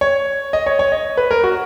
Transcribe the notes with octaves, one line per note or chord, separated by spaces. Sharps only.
C#5
D#5
C#5
C#5
D#5
B4
A#4
F#4